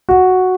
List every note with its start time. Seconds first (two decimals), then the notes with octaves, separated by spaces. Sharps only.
0.09 F#4